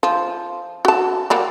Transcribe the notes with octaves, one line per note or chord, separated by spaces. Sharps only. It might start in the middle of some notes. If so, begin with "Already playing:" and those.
F3
F#4 A5
F#3 G3 A#3